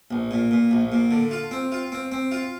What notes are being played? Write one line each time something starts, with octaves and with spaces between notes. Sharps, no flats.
A#1
A#2
A#2
A#1
A#2
D3
F4
C4
F4
C4
C4
F4